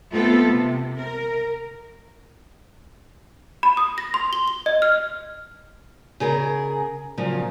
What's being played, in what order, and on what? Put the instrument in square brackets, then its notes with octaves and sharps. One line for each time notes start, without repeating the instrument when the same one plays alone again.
[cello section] A3 B3 C4 F4 A4
C3
A#4
[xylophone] B5
D#6
A#6
C6
G7
G7
D#5
F6
[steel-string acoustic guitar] C#3 G#4 A#4
A#2 C#3 F3 F#3